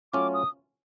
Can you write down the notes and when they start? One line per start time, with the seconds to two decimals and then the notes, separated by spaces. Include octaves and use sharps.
0.13 F#3 A3 C#4 F4 D6
0.34 D#6